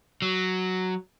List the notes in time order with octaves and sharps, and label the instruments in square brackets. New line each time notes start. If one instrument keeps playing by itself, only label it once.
[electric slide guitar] F#3